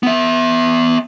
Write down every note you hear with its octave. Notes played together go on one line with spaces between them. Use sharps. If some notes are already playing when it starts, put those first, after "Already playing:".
B3 E5